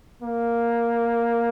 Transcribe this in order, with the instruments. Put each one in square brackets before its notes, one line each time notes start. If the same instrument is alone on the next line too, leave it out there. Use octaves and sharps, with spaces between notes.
[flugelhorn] A#3